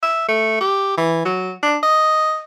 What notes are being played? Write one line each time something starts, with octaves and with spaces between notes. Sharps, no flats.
E5
A3
G4
E3
F#3
D4
D#5